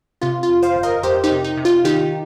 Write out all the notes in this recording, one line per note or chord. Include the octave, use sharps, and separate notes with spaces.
C3 F4
F4
F2
C5 F5
G1
A#4 D#5
F2 G4 C5
D#4 G4
C3
D#4
C3
F4
D#3 D#4 G4